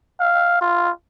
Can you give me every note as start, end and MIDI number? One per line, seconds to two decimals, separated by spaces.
0.20 0.58 77
0.61 0.90 65